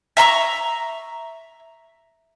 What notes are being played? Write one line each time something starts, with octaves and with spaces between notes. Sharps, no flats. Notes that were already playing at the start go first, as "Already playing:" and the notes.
E5 A#5 C6 C#6